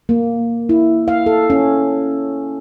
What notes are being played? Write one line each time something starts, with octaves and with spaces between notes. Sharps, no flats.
A#3
E4
F5
A4
C#4